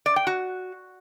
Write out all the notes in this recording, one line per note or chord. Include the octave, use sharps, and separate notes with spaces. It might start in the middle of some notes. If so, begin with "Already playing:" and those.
D5
G5
F#4